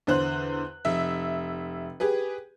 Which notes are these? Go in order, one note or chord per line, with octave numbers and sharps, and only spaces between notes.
E2 D3 C5 F#6
F1 E5
G4 G#4 B4